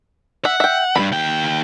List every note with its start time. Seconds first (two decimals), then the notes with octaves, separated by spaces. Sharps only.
0.45 E5 F#5
0.60 E5 G5
0.96 E2 G2 B5
1.12 D#2 G5